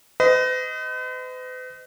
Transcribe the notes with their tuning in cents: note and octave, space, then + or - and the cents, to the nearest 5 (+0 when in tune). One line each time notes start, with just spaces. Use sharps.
B4 +45 D#5 +5